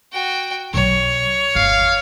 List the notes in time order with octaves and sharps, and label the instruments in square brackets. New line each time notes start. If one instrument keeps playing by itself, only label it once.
[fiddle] F#4 G5
[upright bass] B1 F#3 [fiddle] C#5
[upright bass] G1 E2 [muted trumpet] F5